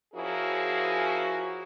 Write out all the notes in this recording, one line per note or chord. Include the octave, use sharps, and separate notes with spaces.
F3 C#4 E4 F#4 G#4 A#4